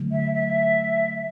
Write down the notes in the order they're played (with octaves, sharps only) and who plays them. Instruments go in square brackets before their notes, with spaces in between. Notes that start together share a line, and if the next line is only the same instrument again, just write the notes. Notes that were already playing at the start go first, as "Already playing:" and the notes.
Already playing: [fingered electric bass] D3 F#3 A3
[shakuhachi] E5
E5